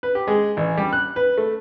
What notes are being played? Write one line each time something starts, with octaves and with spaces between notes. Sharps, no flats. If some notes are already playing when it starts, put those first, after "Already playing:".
B4
G4
G#3
A1
G3
F#6
B4
A3